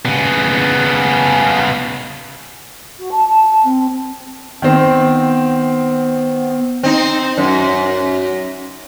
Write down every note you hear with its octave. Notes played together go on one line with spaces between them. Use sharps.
C#3 B3
F#4
A5
A5
C4
D#3 B3 C4
C4 D#4
F#2